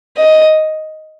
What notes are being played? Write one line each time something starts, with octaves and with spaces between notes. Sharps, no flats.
D#5